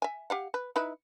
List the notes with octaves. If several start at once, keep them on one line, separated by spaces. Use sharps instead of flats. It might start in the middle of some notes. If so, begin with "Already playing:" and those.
E5 G#5
G4 F5 F#5
B4
D#4 E4 B4